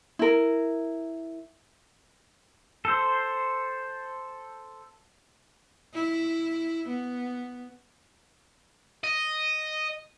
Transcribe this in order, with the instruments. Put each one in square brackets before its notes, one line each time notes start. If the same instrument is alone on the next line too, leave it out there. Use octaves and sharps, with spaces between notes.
[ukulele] E4 A#4
[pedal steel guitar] A4 C5
[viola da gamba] E4
B3
[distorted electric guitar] D#5